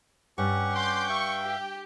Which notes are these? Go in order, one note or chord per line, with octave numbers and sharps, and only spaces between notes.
G2 C#4 G4 F#5 C#6
G5 C6 D6 G6
E5 F5 C#6
G4